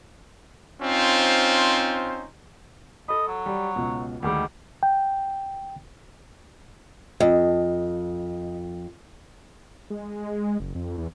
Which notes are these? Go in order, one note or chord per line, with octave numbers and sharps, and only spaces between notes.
C4 C#4 D#4 F4 C5
A4 D#5 B5
F#3
G3
C#2 B2
D2 D#3 G3 G#3
G5
F2 D#5
G#3
G#3
F#1
F2
E2